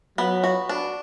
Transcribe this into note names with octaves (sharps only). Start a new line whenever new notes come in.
F#3 B3
F#4
D4